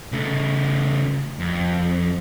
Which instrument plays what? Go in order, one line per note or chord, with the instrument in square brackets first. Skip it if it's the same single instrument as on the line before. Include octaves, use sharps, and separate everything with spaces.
[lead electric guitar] C#3 A3
F2